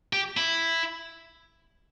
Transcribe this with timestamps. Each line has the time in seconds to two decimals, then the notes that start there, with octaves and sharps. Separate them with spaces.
0.13 G4
0.37 E4